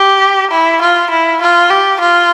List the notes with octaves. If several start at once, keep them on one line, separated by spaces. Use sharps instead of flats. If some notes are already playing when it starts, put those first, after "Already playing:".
Already playing: G4
E4
F4
E4
F4
G4
F4